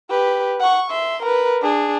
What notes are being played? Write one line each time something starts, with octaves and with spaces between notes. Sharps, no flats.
G4 B4
F#5 C#6
E5 C6
A#4 B4
D4 G#4